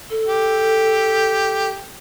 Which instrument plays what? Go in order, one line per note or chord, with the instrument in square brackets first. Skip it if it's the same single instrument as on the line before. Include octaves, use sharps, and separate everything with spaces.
[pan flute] A4
[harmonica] G4